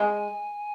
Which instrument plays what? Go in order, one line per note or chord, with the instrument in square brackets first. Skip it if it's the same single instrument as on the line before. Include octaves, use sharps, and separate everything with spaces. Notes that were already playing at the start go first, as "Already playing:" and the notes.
Already playing: [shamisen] G#3 [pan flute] G#5